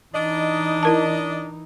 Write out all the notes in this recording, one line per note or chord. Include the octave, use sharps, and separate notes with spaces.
E3 D4 D#4 D#5
E4 A#4 A5